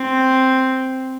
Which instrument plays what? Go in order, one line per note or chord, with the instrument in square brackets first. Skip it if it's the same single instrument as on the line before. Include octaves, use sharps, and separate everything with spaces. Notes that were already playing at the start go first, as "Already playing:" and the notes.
Already playing: [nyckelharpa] C4